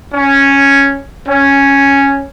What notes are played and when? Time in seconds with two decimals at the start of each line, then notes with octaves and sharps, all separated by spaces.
0.12 C#4
1.27 C#4